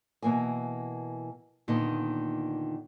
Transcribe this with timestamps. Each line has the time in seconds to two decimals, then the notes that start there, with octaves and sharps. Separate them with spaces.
0.22 B2 E3 A#3 A#4 G#5
1.68 D#2 A#2 D3 D#3 B3 D#4